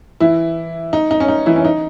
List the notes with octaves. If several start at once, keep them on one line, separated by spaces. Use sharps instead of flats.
E3 E4
D#4
D#4
C#4
D#4
E3 E4
C#4
D#4